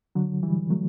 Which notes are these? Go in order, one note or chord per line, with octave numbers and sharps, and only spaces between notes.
D3 F#3
E3 G3
F#3 A3